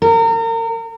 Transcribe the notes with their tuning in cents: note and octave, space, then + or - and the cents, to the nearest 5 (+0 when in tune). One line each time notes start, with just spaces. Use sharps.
A#4 -35